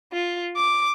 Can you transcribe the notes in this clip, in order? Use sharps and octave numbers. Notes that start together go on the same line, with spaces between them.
F4
D6